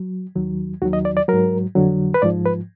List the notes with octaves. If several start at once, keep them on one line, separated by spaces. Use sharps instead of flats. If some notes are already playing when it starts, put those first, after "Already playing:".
Already playing: F#3
D#2 D#3 F#3
D#2 D#3 F#3 F#4
D#5
D5
D5
G#2 F#3 A#4
F2 D3 F#3
B4
G#2 F3 D5
B4